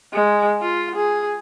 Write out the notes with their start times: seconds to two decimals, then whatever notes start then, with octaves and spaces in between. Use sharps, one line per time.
0.13 G#3
0.61 F4
0.95 G#4